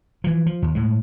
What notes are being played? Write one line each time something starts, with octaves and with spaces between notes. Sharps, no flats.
E3 F3
F3
D#2
A2 G#3